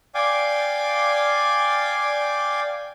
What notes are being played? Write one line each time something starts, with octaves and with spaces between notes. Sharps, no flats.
D5 F5 G5 G#5 D6